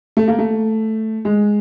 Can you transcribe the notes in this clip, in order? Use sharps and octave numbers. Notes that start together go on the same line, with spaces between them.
A3
A#3
A3
G#3